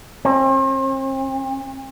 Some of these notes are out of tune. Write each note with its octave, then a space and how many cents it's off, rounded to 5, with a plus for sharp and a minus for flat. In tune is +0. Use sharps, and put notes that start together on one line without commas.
C4 +45